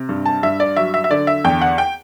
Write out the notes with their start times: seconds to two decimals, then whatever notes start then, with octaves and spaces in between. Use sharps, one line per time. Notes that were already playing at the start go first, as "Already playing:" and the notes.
Already playing: C3
0.09 G2
0.26 A5
0.43 G2 E5
0.60 D5
0.77 F#3 E5
0.94 E5
1.04 E5
1.11 D3 D5
1.27 E5
1.44 E2 G5
1.61 F#5
1.78 G5